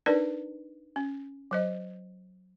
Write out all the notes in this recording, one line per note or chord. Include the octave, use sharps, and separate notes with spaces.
D4 D#4 A#4 B4 D5
C#4
F#3 C5 D#5